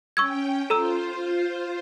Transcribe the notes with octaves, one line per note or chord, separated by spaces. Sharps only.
C#4 G5 C#6 E6 G#6
F4 A4 C5 A#5 E6